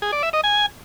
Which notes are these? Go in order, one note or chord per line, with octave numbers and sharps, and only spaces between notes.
G#4
D5
E5
D#5
G#5